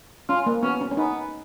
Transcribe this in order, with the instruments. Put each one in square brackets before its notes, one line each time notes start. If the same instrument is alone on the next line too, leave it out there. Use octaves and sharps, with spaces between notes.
[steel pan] C#4 [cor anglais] F4
[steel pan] A#3
[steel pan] B3 [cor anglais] C#4
[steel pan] C#4
C#4
[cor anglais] B3 [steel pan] D#4